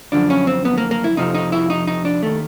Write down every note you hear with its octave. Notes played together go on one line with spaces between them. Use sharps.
F#2 D3 F3 D4
C#4
C4
B3
A#3
A#3
E4
F2 C3 F3 D#4
D#4
E4
D#4
D#4
D4
D#2 D#3 A3